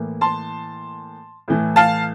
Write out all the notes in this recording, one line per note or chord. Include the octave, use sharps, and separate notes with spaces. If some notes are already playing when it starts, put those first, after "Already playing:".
Already playing: A2 E3 A#3
A5 C6
A2 E3 A3
F5 A5